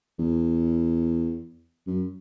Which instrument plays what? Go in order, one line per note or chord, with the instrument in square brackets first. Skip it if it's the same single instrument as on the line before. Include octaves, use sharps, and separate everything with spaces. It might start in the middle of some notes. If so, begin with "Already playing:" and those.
[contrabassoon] E2
F#2